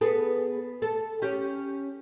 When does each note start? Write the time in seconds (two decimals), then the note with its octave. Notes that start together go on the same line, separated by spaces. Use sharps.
0.01 B3 G#4 A4
0.82 A4
1.22 C#4 G4